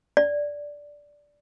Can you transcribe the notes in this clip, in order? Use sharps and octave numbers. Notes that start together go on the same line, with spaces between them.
D5